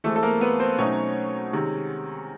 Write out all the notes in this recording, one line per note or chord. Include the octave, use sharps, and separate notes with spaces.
E3 G#3 A3 C4 A4
A4
A#3 A#4
B3 B4
C4 C5
B2 F#3 A3 C4 C#4 D#4 C#5
C3 D#3 G#3